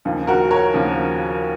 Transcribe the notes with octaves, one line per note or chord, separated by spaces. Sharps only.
D#2 C#3 F3
F#4 A#4
A#4 C#5
D#2 C#3 F3